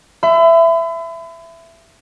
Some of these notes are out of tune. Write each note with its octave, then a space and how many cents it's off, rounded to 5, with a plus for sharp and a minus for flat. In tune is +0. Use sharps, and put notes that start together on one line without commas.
E5 +15 B5 +40